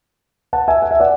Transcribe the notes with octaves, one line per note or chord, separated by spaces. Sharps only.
F#5 A5
E5 G#5
F#5
E5
D5 F#5